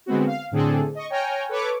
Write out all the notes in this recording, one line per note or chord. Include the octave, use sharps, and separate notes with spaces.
D3 G#3 B3 C4 F#4
F5
A2 D3 C4 D4 G#4 A4
D#5 C#6
C#5 G5 G#5 A#5 F6
A4 B4 C#5 C#6 D6